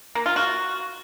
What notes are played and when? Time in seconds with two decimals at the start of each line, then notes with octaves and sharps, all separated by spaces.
0.15 A#3
0.26 F4
0.36 F#4